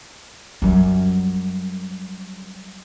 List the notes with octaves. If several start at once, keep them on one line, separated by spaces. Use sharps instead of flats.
F#2 G3